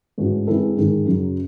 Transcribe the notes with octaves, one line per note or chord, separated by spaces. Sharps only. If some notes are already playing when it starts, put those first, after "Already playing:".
G#2 E3 A3 C#4 F#4
E3 G#3 C4 E4 A4
G#2 D#3 G#3
F#2 C#3 F#3